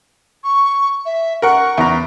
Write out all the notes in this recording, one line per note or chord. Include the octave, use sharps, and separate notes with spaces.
C#6
E5
A#4 F#5 C#6
E2 A#5